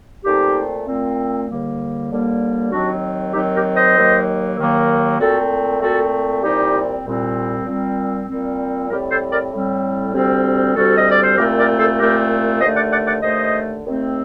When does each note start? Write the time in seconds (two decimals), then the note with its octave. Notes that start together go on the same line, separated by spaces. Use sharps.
0.24 A#2 A3 C4 D#4 G4
0.87 A#2 A3 C4
1.49 D#2 D3 G3 A#3
2.10 D#2 D3 G3 A#3
2.72 D#2 D#3 F#3 C4 D4 F#4
3.33 D#2 D#3 F#3 C4 D#4 G4
3.55 G4 A#4
3.75 C5 D#5
3.96 D#2 D#3 F#3 A#3
4.57 D#2 D#3 F#3 A#3
5.19 A#2 A3 C4 F#4 A4
5.81 A#2 A3 C4 F#4 A4
6.42 C2 A#2 G3 C4 D#4 G4
7.05 C2 A#2 G3 C4
7.66 A#2 G3 C4
8.29 A#2 G3 C4
8.89 A2 G3 C4 G4 A#4
9.10 A4 C5
9.31 A#4 D5
9.52 A2 G3 C4
10.13 D2 C3 G3 C4
10.75 D2 C3 G3 C4 F#4 A4
10.97 D#5
11.10 D5
11.24 C5
11.37 C2 A#2 A3 C4 G4 A#4
11.58 A#4 D5
11.78 A4 C5
11.98 C2 A#2 A3 C4 G4 A#4
12.61 D#2 D3 A3 C5 D#5
12.76 D5 F#5
12.91 D5 F#5
13.07 D5 F#5
13.22 D#2 D3 A3 C5 D#5
13.84 D#2 D#3 A3 C4